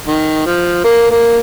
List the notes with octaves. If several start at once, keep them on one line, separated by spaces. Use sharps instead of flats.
D#3
F3
A#3
A#3